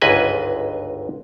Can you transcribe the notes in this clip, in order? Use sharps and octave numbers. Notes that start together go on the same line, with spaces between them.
G1 C#2 G#2 B4 D#5 G#5